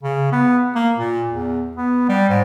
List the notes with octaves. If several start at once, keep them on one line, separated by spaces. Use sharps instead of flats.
C#3
B3
A#3
A#2
E2
B3
G3
G#2